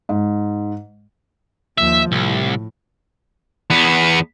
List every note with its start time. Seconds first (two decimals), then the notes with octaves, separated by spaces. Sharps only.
0.09 G#2
1.78 D#2 F3 E5
2.12 C2 A2
3.70 E2 B3